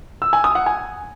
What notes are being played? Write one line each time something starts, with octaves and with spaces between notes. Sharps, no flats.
E6
G#5
D#6
F#5
G#5